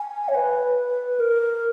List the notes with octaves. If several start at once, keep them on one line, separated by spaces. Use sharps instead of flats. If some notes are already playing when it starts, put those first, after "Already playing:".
Already playing: G#5
C#5
B4
A#4